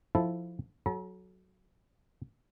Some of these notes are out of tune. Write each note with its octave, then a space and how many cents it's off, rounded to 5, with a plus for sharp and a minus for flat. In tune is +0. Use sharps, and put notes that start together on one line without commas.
F3 +0 E4 +0 A4 -10
F#3 +0 A4 -30 A#5 +40